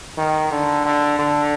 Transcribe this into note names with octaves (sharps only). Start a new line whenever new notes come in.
D#3
D3
D3
D3